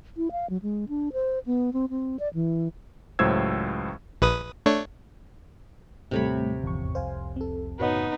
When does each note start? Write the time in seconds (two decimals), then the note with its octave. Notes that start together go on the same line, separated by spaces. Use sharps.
0.17 E4
0.32 F5
0.50 F#3
0.62 G#3
0.89 D4
1.13 C5
1.46 B3
1.73 C4
1.90 C4
2.20 D5
2.34 E3
3.19 C#2 A2 F#3 C5 E6 G#6
4.22 A#1 B4 D#6
4.66 A3 D4 C#5
6.11 D#2 A2 C3 G3 A3 C4 C#5 B5
6.63 D1 G#1 E2 D3 F3 C#6
6.95 C2 F2 C5 F5 G#5
7.36 C4 A4
7.79 F#2 A2 C#3 B3 D#4 F#4 C#5 D#5